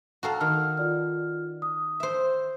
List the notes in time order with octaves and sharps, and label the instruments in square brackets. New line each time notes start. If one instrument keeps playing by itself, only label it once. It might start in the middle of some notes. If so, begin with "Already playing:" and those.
[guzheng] F#4 A4 F5 [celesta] G5 A#5
[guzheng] D#3 [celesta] F6
[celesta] F4 D5 F6
D#6
[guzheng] C5 E5